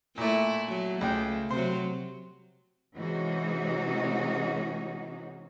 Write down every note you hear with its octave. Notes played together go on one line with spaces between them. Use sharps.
A#2 A3 E4
F#3
C#2 A3 G5
C3 F#3 C5
C3 E3 G#3 C#4 D#4 F#4